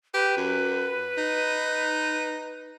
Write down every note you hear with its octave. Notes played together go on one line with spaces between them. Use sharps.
G4 B4
F#2
D#4